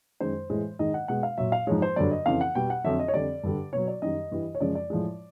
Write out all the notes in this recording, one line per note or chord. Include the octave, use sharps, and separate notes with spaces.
F#2 D#3 G#3 C5
A2 E3 G#3
G#2 D#3 G#3 D#5
F#5
B2 G#3 F#5
F5
A#2 F#3 E5
F5
G#2 F3 G#3 C#5
C5
G2 D3 F#3 D5
D#5
F2 C#3 E3 F5
F#5
B2 G3 G5
F#5
F2 D3 F#3 E5
D#5
C#5
F2 D3 G3 D5
G2 D3 G3
B2 F#3 C#5
D5
F#2 D#3 G3 D#5
G2 E3 G3
C#5
F#2 C#3 F3 G#3 D5
D5
A2 F3 G#3